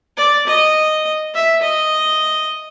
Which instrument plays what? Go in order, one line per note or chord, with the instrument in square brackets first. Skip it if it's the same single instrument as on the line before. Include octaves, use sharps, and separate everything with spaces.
[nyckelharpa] D5
D#5
E5
D#5